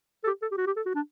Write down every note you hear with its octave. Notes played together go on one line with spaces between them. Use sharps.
A4
G4
A4
G4
F#4
G4
A4
F#4
D4